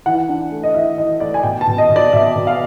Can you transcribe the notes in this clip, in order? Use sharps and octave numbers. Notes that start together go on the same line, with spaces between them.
E3 F#5
D4
A3
D#5
E3 E5
E3 D#5
A3 D5
G#5
B2 G5
A5
B2
D#5
B2
D5
B2 E5
B2
F5